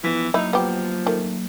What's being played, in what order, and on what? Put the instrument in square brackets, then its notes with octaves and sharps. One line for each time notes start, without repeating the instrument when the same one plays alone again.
[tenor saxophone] E3 [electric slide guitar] F3 B3
[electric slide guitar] F#3 A#3 A#5 [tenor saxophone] D#4 [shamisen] E4
[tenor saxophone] F3 [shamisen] B3 G4
[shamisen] D#3 A3